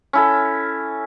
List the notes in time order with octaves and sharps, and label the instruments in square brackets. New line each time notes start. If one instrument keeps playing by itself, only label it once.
[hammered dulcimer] C#4 E4 A4